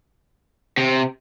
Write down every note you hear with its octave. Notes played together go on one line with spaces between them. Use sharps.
C3